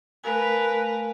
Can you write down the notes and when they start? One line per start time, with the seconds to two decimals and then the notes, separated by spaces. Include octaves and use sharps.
0.24 A3 A#4 B4 F5 G#5